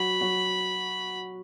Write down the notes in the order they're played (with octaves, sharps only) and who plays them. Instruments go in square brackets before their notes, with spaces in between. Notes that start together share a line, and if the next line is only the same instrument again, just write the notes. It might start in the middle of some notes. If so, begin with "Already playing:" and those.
Already playing: [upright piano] F#3 F#4 [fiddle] B5
[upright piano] F#3 F#4